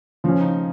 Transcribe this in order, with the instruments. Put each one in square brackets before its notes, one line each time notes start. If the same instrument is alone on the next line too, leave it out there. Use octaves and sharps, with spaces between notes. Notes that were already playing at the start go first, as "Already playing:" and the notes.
[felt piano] C#3 [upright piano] F3 C#4
[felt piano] D#4